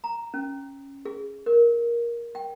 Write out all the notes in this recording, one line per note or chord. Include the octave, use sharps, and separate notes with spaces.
A#5
C#4
G#4
A#4
G5